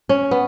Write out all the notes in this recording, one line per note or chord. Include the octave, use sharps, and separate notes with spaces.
C#4
B3